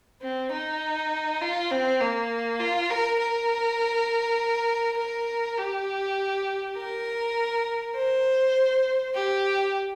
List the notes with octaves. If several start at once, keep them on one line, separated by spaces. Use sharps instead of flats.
C4
D#4
F4
C4
A#3
F4
A#4
A#4
A#4
G4
A#4
C5
G4